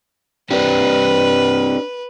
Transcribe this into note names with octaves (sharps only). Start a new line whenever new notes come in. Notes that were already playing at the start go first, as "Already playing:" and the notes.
C4 D4 G4 B4